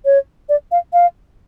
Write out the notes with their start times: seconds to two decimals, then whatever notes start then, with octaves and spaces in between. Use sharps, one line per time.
0.05 C#5
0.49 D5
0.72 F5
0.93 F5